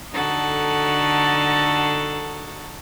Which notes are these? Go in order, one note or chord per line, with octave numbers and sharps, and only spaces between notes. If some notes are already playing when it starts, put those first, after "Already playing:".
D3 D#4 F#4 A4